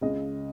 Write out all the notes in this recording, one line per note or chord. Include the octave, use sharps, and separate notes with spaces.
C#2 C#3 D#5